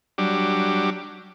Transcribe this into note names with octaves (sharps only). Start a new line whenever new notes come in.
F#3 G3 D4